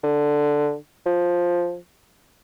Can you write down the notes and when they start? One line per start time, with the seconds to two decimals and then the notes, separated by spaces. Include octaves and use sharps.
0.03 D3
1.06 F3